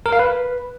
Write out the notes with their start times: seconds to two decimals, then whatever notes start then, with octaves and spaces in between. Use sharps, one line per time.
0.06 A#4
0.13 F5
0.19 B4